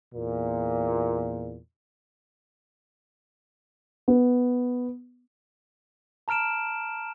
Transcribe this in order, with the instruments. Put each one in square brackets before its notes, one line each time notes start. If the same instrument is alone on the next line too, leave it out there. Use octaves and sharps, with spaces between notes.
[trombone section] E2 A#2
[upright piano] B3
[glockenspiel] A5 A#5 F6 D7 E7